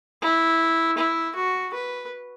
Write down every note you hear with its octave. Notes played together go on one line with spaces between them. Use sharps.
E4
E4
F#4
B4